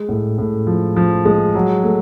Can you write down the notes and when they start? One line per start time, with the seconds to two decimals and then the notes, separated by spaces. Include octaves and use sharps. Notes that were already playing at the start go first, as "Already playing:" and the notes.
Already playing: G#3
0.09 A2
0.38 A2
0.67 F3
0.96 F3
1.25 G#3
1.55 F#3
1.84 A3